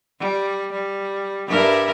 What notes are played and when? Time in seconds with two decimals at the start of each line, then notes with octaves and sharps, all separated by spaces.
0.20 G3
0.72 G3
1.48 G2 E4 A#4